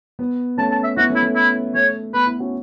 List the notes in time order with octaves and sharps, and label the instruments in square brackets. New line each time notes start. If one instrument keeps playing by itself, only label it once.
[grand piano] B3
[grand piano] A3 C#4 [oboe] A5
[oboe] A5
E5
[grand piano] B3 E4 [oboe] F#4
[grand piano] A3 C#4
[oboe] E4
[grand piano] A3
[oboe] E4
[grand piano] A3 [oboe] C#5
[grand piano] B3 [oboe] B4
[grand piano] B3 E4
C#4 F#4